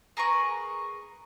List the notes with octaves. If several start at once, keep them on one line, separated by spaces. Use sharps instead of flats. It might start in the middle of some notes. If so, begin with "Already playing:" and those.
G#4 A#4 B4 C#6